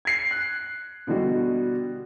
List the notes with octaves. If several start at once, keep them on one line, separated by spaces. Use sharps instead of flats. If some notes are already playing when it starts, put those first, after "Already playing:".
G#6 C7
F#6
B2 D3 G3 F#4 D#5